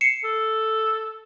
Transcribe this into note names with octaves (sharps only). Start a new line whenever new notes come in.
C7 C#7 E7
A4